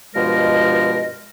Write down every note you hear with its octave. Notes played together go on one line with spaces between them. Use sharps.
G2 B2 F3 G#3 A#4 D#5